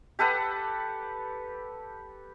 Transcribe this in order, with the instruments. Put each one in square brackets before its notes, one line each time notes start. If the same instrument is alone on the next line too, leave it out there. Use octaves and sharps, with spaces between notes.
[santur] G4 A4 B4 F#5